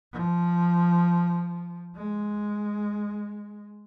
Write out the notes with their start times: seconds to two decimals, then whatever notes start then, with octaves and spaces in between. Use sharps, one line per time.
0.13 F3
1.96 G#3